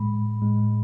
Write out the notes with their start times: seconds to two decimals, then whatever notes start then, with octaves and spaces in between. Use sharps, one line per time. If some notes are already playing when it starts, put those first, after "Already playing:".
Already playing: A2 G#3 B5
0.42 A2 G#3